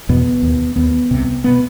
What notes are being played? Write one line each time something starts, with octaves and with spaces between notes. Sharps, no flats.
E2 B2 B3
D#2
D#2 B3
C2 C3
B2 B3